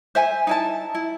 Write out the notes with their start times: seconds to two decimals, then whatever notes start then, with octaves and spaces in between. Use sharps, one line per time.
0.15 C5 E5 G#5
0.47 D#4 E4 A5
0.95 E4